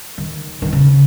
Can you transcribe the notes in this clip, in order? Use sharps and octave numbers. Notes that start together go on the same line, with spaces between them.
D#3
D#3
C#3